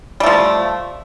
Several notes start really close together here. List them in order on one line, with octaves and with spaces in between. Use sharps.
G3 A3 F3